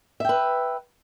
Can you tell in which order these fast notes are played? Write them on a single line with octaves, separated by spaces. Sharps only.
E5 G5 B4